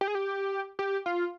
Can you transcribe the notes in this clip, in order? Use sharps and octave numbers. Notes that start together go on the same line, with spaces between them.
G4
G#4
G4
G4
F4